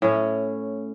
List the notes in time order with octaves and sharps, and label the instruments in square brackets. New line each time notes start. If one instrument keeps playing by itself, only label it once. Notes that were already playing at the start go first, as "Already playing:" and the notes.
[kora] A2 C#4